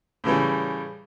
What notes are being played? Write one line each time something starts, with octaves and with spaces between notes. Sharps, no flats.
A2 C#3 E3 G3